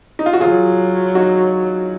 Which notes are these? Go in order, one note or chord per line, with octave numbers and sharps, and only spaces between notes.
D#4
F4
F#4
F#3 F4 G#4
D#4 F#4